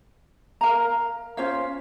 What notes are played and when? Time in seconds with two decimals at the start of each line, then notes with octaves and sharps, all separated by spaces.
0.61 A#4 F5 A#5
1.37 C#4 F4 C5 F5